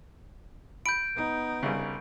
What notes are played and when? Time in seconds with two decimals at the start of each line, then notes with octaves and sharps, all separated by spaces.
0.86 B5 G6 D7
1.16 B3 D#4
1.63 C2 C#3